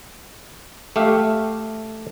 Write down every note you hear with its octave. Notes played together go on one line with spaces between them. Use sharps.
A3 G4 E5 F5